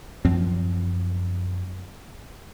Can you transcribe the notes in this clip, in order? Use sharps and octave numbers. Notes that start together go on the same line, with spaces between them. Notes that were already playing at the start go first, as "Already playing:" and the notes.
F#2 F3 C4